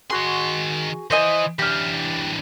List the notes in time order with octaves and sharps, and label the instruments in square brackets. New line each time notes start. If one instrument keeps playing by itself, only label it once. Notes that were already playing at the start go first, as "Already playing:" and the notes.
[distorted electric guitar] D#3 C6 [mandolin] F#4 G#4
[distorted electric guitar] E3 [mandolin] C5 D#5 G#5
[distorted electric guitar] E3 D4 [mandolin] G4 F6